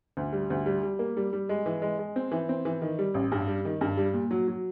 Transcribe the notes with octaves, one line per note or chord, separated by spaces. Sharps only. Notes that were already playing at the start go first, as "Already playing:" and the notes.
D2
G3
D2
G3
G3
A#3
G3
G3
G#3
E3
G#3
G#3
C4
E3
C4
E3
D#3
G3
A1
G2
G3
D#3
G2
G3
A#2
F#3
F#3